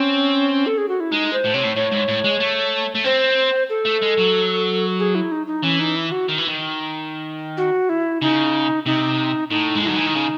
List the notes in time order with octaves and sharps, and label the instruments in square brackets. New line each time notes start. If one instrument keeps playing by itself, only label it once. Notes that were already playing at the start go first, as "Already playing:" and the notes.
Already playing: [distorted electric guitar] C4 [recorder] C#4
[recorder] A4
G#4
F#4
E4
[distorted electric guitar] G#3 [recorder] D#4
[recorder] C5
[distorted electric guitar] A2
[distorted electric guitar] C3 [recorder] C#5
[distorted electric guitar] A2
[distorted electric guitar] A2 [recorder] C#5
[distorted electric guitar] G#2
A2
G#3
A3
A3
[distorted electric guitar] C4 [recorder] C5
[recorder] A4
[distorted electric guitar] A3
G#3
F#3
[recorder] G#4
E4
D#4
D#4
[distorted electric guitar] E3 [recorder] C#4
[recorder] D#4
E4
F#4
[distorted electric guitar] D#3
E3
D#3
[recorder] F#4
E4
[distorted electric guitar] C#3 [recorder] D#4
[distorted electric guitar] C3 [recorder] D#4
[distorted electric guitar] A2 [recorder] D#4
[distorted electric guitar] G#3
[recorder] E4
[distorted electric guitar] F#3 [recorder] D#4
[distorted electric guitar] E3
D#3
C#3